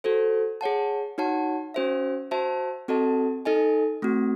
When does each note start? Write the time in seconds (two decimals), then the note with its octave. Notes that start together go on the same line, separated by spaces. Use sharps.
0.04 F#4 A4 C5
0.61 G#4 C#5 F#5 A5
1.18 D#4 F#4 C#5 F#5 A5
1.74 C#4 F#4 C5 E5
2.31 F#4 C5 E5 A5
2.88 C4 F#4 A4 D#5 A5
3.45 D#4 A4 D#5 G#5
4.02 A3 C4 F#4